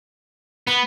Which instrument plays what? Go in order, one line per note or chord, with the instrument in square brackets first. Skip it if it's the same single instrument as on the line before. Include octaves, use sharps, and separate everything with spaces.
[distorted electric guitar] B3 [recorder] B5